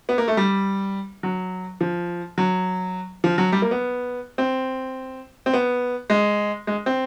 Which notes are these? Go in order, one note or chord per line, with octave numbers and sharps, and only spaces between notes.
B3
A#3
A3
G3
F#3
F3
F#3
F3
F#3
G3
A#3
B3
C4
C4
B3
G#3
G#3
C4